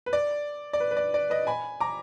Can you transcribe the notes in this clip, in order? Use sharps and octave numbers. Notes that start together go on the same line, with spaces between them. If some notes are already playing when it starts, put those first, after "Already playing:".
B4
D5
D5
B4
B4
D5
D5
B4 D#5
G#5 B5
A#5 D6